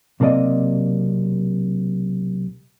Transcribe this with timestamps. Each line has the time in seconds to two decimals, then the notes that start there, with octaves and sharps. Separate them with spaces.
0.20 B1 C3 A#3 A4 D5 D#5